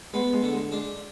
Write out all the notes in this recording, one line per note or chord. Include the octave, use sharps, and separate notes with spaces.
G#3 B3
G#3
D3
G#3
G#3 D4